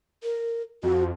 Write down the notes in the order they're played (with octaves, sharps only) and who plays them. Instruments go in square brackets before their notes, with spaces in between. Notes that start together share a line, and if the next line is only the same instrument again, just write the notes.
[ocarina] A#4
[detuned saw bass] F2 [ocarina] F#4